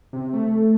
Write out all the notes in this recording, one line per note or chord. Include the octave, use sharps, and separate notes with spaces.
C3
A3